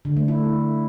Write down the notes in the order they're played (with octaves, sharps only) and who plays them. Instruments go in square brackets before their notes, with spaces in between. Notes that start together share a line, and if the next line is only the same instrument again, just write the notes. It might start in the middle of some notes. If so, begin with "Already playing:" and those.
[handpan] D3
A3
E4